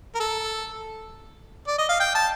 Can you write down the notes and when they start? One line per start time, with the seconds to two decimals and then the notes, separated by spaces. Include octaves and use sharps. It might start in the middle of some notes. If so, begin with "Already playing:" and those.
0.15 A#4
0.20 A4
1.67 D5
1.78 D#5
1.89 F5
2.00 G5
2.15 A5